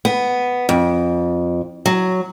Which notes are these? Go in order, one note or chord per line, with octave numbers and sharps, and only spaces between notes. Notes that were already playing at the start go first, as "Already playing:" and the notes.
B3
F2
F#3